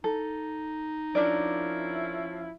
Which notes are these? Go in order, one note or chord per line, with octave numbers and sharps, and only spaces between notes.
D#4 A4
F3 C#4 D4 E4 A#4 D5